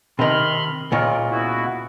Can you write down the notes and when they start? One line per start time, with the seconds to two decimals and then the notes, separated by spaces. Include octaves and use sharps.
0.19 C3 D#3 B5 C6 F6
0.92 C#2 A#2 F4 A#4 C#5
1.30 B3 E4 F#4